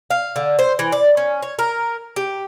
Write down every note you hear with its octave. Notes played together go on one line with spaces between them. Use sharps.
F5
D3
C5
E3
D5
C#4
C#5
A#4
G4